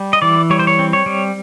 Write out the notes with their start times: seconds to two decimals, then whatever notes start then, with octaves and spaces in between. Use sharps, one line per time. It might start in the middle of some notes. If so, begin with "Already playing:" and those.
Already playing: G3
0.13 D#5
0.22 E3 D5
0.50 G3 C#5
0.59 C5
0.67 C#5
0.79 C4
0.93 C#5
1.06 G3